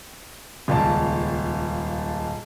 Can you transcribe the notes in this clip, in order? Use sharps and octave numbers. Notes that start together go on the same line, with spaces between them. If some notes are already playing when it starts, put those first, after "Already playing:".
D#1 C#2 D5 A5